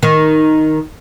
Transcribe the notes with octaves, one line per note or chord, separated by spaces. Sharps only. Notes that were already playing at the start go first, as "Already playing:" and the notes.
D#3